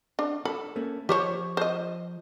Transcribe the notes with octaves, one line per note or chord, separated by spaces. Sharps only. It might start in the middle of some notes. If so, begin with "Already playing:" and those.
D4
A4 B5
A3 A#3 C#4
F3 G4 C5 C#5
C5 D#5